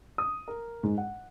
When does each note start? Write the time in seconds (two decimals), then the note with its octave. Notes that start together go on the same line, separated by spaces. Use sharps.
0.18 D#6
0.48 A#4
0.83 G#2
0.98 F#5